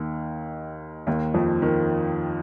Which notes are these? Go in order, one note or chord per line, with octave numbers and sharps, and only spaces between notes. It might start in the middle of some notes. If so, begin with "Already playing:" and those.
Already playing: D#2 D#3
D#2 D#3
F2 F3
D#3